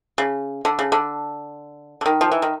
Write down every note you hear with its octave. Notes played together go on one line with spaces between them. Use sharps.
C#3
D3
C#3
D3
D3
D#3
F3
E3
D#3